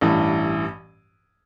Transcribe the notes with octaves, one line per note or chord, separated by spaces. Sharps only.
A1 G2 E3